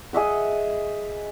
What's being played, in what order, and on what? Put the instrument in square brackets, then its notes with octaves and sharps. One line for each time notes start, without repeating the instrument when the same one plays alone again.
[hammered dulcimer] G#4 D#5 E5 F#5